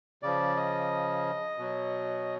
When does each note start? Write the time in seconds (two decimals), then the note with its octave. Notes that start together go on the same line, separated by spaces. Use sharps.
0.23 C#3 F3 D5
0.57 D#5
1.58 B2 F#3